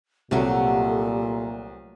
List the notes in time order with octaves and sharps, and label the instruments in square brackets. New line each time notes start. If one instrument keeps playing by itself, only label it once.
[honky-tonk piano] C2 [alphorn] A#2 [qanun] F#3 A3 [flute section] G4 A4